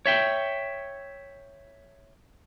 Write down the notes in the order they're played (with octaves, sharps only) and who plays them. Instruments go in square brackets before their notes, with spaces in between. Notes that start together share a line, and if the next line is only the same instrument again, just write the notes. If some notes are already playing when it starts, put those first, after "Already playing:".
[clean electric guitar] C#5 E5 G5